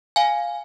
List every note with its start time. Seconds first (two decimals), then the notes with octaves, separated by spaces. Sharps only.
0.16 F5 G#5